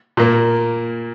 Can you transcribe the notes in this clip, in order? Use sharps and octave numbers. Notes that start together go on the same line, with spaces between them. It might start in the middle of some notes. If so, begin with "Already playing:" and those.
A#2 A#3